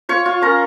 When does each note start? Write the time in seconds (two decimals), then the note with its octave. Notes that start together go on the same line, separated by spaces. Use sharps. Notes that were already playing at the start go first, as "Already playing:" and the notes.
0.09 F4 C#5 C#6
0.26 F4
0.42 C#4 A#4 A#5